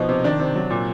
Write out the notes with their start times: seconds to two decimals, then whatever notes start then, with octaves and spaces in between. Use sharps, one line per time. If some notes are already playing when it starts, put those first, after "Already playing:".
Already playing: B2 F3 D#4
0.09 C3
0.24 D#3 D4
0.39 C3
0.55 F#3
0.70 A#2